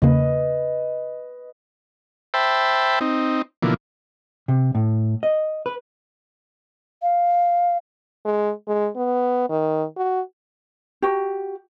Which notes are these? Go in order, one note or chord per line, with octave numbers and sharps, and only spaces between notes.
E2 C#3 A#3 B4 D#5
C5 E5 G5 A5 B5
C4 D#4
B2 D3 E3 F3 A#3
C3
A2
D#5
B4
F5
G#3
G#3
B3
D#3
F#4
F#4 G4